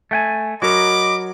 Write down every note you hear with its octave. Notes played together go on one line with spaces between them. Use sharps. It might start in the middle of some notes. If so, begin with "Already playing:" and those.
A3 G5 G#5
F#3 F#4 A#4 D#5 B5 D6